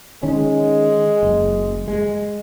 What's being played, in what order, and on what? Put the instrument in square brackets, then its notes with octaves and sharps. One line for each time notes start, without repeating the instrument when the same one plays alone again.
[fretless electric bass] D#3 C#4 [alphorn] G#3
[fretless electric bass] F#1
G#3